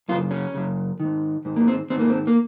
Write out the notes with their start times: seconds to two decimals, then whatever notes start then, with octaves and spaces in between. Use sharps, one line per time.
0.09 F#2 C#3 F4
0.31 C#4
0.54 F#2 C#3
1.00 G#2 D#3
1.45 G#2 D#3
1.56 A#3
1.68 C4
1.90 G#2 D#3 C4
1.99 A#3
2.10 C4
2.27 A#3